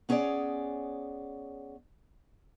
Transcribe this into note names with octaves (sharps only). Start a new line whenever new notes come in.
B3 C#4 G#4 C#5 D5